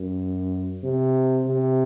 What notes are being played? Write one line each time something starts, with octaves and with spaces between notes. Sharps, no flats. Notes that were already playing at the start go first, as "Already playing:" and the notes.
Already playing: F#2
C3
C3